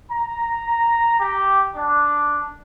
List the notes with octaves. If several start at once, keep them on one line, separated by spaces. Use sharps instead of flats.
A#5
G4
D4